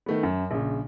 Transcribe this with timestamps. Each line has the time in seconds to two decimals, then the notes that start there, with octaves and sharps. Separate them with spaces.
0.06 D#3 A3 B3
0.23 F#2
0.51 A#1 C#3